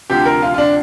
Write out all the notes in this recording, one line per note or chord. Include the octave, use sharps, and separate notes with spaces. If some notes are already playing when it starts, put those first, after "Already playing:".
D2 C3 F3 G4
A#4
F4
F4
D4